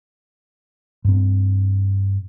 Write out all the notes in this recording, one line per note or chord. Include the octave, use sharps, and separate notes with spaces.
G2 C4